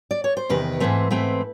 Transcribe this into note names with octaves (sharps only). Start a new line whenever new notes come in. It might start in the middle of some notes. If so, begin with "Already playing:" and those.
D5
C#5
C5
E2 C3 D#3 B4
G#2 E3 A3 C4
G#2 E3 A3 C4